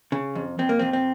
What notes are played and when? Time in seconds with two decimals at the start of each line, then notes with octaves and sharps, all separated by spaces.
0.12 C#3
0.35 F2
0.59 F2 C4
0.69 A#3
0.79 F2 C4
0.93 C4